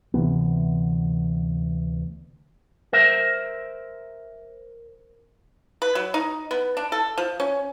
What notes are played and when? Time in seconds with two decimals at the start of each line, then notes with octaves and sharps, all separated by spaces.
0.14 D2 C3 E3 B3
2.93 A#4 C5 E5
5.82 B4
5.95 F#3
6.14 D#4
6.51 B3
6.77 D4
6.92 A4
7.18 F3
7.40 C#4